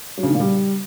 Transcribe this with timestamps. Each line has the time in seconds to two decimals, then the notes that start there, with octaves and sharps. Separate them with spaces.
0.17 F#3
0.23 C#3
0.29 D#3
0.34 A#2
0.40 G3